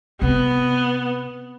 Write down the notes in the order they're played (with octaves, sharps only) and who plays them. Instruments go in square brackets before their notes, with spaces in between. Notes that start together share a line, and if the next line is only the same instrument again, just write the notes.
[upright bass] C3 C4 [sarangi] B3